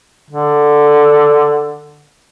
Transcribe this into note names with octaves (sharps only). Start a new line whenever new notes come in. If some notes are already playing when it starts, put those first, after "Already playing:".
D3